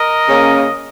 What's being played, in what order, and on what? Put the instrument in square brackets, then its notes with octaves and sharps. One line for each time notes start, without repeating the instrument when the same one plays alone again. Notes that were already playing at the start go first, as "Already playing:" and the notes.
Already playing: [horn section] A#4 D#5
C#3 A#3 C#4